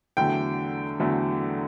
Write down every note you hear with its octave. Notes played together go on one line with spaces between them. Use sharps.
E2 D3 F#3 A3 G5
E2 D3 F#3 A3